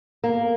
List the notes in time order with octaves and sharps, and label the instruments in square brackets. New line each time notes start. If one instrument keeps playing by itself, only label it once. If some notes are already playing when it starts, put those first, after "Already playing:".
[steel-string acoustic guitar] A#3